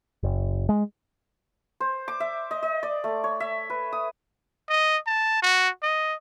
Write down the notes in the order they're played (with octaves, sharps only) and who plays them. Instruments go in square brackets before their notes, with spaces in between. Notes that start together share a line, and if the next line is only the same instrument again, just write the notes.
[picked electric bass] F#1
G#3
[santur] C5
D6
E5
D#5
D#5
D5
A3
C#5
E5
B4
D#6
[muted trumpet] D#5
A5
F#4
D#5